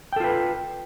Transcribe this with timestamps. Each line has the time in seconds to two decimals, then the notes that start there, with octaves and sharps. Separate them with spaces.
0.13 G5
0.16 A4
0.20 F4
0.24 B4